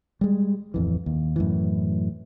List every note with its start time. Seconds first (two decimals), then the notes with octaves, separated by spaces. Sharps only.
0.21 G3 G#3
0.74 D1 F2 E3
1.06 D#2
1.36 F#2 A2 E3